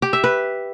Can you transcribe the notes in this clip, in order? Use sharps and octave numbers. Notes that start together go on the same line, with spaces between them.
G4
E5
B4